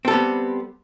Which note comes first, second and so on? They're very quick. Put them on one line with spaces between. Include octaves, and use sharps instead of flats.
C4 A4 G3 B3